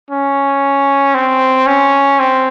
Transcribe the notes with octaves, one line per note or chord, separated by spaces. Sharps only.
C#4
C4
C#4
C4